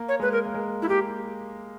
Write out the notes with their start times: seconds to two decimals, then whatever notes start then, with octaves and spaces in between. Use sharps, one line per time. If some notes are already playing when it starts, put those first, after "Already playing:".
Already playing: A#3
0.08 C#5
0.20 G#3 B4
0.32 A#4
0.45 A#3
0.54 G#3
0.82 E4
0.89 A#3 G4